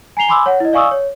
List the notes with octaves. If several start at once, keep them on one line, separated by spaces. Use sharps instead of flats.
G#5 A#5 C7 F7 G7
G#5 B5 C6 D6 E6
C#5 F#5
E4 D#5
D5 F5 G#5 C#6 D#6 E6
C#5